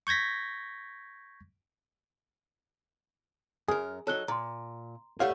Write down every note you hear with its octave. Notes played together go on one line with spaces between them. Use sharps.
C#6 G6 G#6 A#6 B6
F#2 G#4 A#4
F#3 D#4 A4 C#5 F#6 G7
A#2 A#5 C6
G3 A3 G4 C#5 F5 F#5